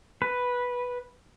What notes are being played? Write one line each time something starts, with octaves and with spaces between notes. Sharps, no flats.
B4